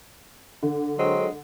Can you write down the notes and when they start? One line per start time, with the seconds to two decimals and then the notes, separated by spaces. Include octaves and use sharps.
0.63 D3
0.98 F#3 G#3 C4